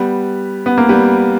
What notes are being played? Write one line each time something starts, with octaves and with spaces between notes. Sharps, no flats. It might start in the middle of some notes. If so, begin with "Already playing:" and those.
Already playing: G3 B3
B3
A#3
G3 B3